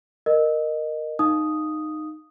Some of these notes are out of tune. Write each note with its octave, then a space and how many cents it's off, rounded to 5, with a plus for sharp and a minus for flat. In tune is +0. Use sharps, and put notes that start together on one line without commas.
A#4 +0 D#5 -15
D#4 -15 F5 +0 D#6 +0